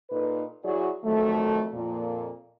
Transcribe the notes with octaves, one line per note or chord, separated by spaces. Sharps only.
A#2 D#4 A4 B4
F#3 E4 F#4 G#4 D5
F2 D#3 F#3 A3
F2 A#2